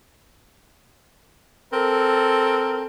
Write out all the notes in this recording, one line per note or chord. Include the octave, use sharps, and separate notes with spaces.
C4 A4 A#4